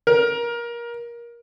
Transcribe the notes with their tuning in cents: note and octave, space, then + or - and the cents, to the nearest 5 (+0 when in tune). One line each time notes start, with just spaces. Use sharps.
A#4 +20